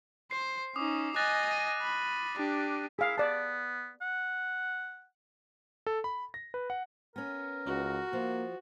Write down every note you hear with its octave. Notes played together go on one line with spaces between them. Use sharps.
C5 C7
C#4 D#4 D6 D#6
D#5 G#5 F#6 A6 A#6
D#7
B5
D4 G4
E4 G#4 F5
B3 D5 A5
F#5
A4
B5
A#6
B4
F#5
B3 C#4 A#4
C#2 F#4
F3 A#3